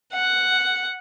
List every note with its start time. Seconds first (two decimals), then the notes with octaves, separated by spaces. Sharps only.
0.13 F#5